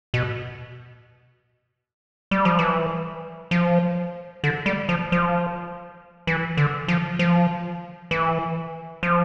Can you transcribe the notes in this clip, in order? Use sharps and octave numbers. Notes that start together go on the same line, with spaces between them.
B2
G3
F3
E3
F3
D3
G3
F3
F3
E3
D3
F3
F3
E3
F3